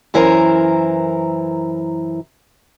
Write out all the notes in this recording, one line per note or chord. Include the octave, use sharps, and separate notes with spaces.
F#2 E3 E4 A#4 C5 A#5